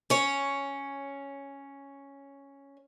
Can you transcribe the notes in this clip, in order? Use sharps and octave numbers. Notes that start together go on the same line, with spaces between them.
C#4 C#5